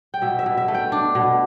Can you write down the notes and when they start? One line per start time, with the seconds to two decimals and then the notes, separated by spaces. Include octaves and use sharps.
0.14 G5
0.22 B2 E5
0.39 E5
0.46 B2
0.57 E5
0.68 A3
0.74 G5
0.92 D4
1.15 B2